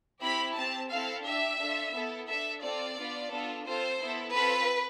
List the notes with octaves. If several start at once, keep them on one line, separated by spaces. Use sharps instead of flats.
C4 E4 G4 B5
C4 G4 A5
C4 E4 A4 F5
D4 G4 E5
D4 F4 A4
B3 E4 A4
D4 A4 E5
C4 F4 A4 D5
B3 D4 F4
B3 D4 F4 A4
C4 F4 A4 C5
B3 E4 A4
C4 F4 A4 B4